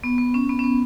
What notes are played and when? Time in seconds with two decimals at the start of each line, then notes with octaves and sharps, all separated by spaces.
0.04 B3
0.18 B3
0.34 C#4
0.49 B3
0.59 C#4
0.64 B3